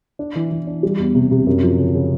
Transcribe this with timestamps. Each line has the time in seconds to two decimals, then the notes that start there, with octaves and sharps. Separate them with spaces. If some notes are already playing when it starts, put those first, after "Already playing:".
0.19 D4
0.36 E3
0.51 E3
0.67 D4
0.83 G3
0.99 E2
1.15 C3
1.31 C3
1.47 F#2
1.63 F3
1.78 C#3
1.94 C#3